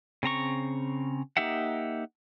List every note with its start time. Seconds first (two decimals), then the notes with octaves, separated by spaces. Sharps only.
0.23 C#3 C4 A#5 C#6
1.37 A#3 D#4 G4 E5 F#5